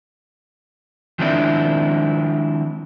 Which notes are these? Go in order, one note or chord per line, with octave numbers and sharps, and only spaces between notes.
D#3 F3 G#3 C4 D4 E4